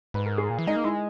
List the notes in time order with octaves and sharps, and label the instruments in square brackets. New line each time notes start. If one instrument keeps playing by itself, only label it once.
[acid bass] G#2 [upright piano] B4
[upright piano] A#4
G#4
[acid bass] A#2
E3
[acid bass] G#3 [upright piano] D#4
[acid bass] A#3
[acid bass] G#3 [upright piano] E4